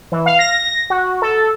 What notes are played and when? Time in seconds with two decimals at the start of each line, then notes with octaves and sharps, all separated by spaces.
0.12 E3
0.26 F5
0.39 A#6
0.90 F#4
1.22 A4